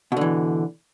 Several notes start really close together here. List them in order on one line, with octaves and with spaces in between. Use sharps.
B2 D3 E3